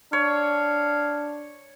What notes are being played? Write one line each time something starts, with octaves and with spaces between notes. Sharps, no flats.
D4 C#5 F5